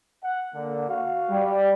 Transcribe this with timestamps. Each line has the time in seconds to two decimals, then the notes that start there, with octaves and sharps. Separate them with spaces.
0.24 F#5
0.54 D3 A#3
0.88 F#4 F5
1.31 G3